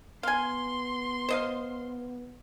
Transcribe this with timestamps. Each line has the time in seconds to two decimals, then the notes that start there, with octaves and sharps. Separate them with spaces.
0.23 B3 F5 G#5 C6
1.29 C5 D#5 F5